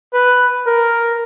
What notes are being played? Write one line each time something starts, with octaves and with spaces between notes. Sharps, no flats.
B4
A#4